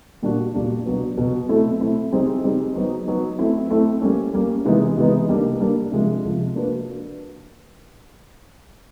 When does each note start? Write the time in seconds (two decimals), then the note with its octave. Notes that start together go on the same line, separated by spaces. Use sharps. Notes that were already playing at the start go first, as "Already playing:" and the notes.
0.22 A#2 G3 A#3 D4 F#4
0.54 A#2 G3 A#3 D4 F#4
0.86 B2 F#3 B3
1.17 B2 F#3 B3
1.49 A3 C4 E4 A4
1.80 A3 C4 E4 A4
2.12 G3 C4 D#4 G#4 C5
2.44 G3 C4 D#4 G#4 C5
2.76 F#3 B3 D#4
3.07 F#3 B3 D#4
3.39 A3 C4 E4
3.70 A3 C4 E4
4.02 G3 A#3 C#4
4.34 G3 A#3 C#4
4.65 C3 E3 G#3 B3 D#4
4.97 C3 E3 G#3 B3 D#4
5.29 G3 A#3 D4
5.60 G3 A#3 D4
5.92 C3 F3 G#3
6.24 C3 F3 G#3
6.55 A#3 D4 F#4 B4